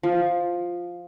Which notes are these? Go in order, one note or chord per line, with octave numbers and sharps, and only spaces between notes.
F3